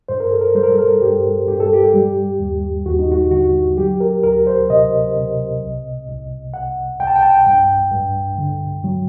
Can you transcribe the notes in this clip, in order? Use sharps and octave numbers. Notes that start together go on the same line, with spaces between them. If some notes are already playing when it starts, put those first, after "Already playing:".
G2 C5
A#4
A4
A#4
G3 C5
A#4
A4
A#4
G2 G4
G2 G4
A4
G4
G3
D#2
D#2 F#4
D#4
F#4
D3 F#4
F#3 G4
A#4
D2 A#4
C5
C3 D#5
C3
C2
C2
C2 F#5
C2 G5
A5
G5
A5
G5
G2 G5
G2
D3
F#3